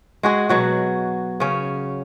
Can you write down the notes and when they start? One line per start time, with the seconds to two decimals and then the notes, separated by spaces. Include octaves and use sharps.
0.23 G#3 F#4 G#4
0.49 B2 F#3 F#4
1.40 C#3 C#4